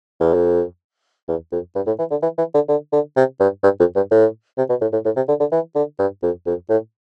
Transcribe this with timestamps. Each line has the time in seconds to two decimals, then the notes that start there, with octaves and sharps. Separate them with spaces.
0.20 E2
0.34 F2
1.28 E2
1.52 F2
1.76 G2
1.87 A2
1.99 E3
2.11 D3
2.23 E3
2.38 E3
2.54 D3
2.69 D3
2.93 D3
3.16 C3
3.40 G2
3.63 G2
3.80 F2
3.96 G2
4.11 A2
4.58 C3
4.69 B2
4.81 A2
4.93 A2
5.05 A2
5.16 C3
5.29 D3
5.40 D3
5.52 E3
5.75 D3
5.99 G2
6.23 F2
6.47 F2
6.69 A2